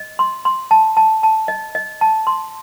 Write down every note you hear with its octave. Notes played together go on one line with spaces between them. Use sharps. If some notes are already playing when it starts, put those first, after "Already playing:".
Already playing: D#5
C6
C6
A5
A5
A5
D#5
D#5
A5
C6